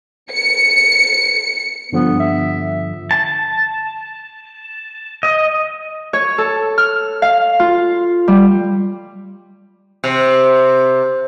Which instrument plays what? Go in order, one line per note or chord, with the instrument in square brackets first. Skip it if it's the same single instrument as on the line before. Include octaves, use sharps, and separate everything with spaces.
[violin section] C#7
[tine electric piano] G2 D3 F3 [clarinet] B3
[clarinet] E5
[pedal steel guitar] A5
D#5
[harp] C#5
A4
F6
F5
F4
G3
[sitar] C3